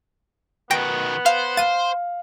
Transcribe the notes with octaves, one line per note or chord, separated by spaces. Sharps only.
B2 D#3 B3 G5 A#6 D7
C5 F5
F5 A6 D#7